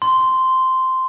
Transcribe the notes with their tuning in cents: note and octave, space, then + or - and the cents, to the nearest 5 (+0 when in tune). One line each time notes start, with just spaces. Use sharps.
C6 -10